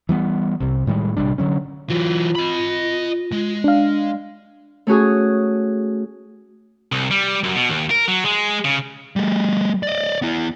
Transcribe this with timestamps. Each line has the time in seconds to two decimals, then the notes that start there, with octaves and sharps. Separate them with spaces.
0.09 E3 G3 B3
0.60 C2 C3
0.87 A2 D#3 G3 G#3
1.17 A#1 C3 G3 D4
1.38 D3 F#3 C#4
1.90 E3 F#3 F4
2.36 D#5 B5
3.32 G#3
3.64 D4 F5
4.87 A3 C#4 F#4 G#4
6.92 C2
7.11 G3
7.43 F#2
7.55 B2
7.70 D#2
7.90 A#4
8.08 F#3
8.25 G#3
8.65 C#3
9.16 G3 A3
9.83 D5 D#5
10.22 B3 E4